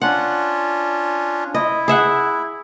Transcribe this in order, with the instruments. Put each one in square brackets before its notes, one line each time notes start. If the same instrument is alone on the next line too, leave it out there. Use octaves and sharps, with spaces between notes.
[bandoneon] C#4 D4 F4 [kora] F#5
[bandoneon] E4 [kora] D#5
[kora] G#4 E5 F#5